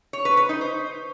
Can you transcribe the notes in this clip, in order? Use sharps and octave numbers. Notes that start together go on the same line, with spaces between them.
C#5
B4
B4
D#4
C5